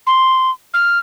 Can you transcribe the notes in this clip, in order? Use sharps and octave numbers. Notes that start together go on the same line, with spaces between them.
C6
F6